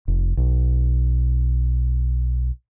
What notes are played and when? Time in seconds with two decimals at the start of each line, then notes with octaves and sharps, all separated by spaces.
0.08 F1
0.37 B1